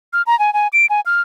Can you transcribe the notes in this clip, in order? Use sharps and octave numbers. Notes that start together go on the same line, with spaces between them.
F6
A#5
G#5
G#5
D7
G#5
F6